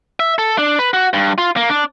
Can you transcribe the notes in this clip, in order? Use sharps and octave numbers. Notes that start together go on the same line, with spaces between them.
E5
A4
D4
B4
F#4
G2
F4
A#3
D4